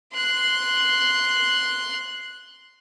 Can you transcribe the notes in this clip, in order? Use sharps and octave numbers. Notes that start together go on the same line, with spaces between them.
C6 F#6